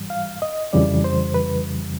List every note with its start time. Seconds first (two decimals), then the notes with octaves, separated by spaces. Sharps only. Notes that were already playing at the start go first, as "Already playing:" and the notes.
Already playing: G#2 E3 G3
0.10 F5
0.42 D#5
0.73 F2 C#3 E3 G3 D5
1.04 C5
1.34 B4